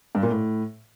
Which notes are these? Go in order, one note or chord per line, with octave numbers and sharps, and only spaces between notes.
G2
A#2
A2